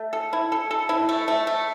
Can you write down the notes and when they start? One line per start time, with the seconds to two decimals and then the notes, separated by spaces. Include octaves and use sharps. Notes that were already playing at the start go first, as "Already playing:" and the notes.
Already playing: A3
0.13 A4
0.33 E4
0.52 A4
0.71 A4
0.89 E4
1.09 A3
1.28 A3
1.47 A3